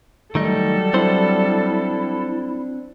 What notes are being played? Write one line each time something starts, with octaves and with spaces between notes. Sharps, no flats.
D#3 F#3 G3 A3 D#4 A4
C4 D4 E4 C5